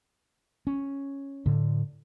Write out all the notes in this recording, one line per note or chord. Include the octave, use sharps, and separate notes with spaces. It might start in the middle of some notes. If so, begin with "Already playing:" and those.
C#4
A2 D3